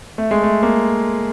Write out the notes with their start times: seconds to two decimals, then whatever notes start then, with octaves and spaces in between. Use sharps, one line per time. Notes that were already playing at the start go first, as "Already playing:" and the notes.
0.18 A3
0.31 G#3
0.43 A3
0.63 A#3